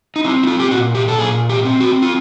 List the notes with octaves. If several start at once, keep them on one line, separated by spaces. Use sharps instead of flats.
D#4
C4 E4
E4
F4
G4
A#2 F#4
G4
A4
A#2 G#4
G4
C4
F#4
F4